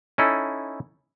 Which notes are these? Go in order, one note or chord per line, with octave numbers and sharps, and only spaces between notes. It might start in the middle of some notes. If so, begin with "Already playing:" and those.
C#4 D#4 E4 A4